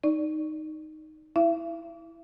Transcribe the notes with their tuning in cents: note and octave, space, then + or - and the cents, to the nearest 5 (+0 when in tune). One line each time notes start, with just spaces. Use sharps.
D#4 +0 D5 +0
E4 +0 E5 +40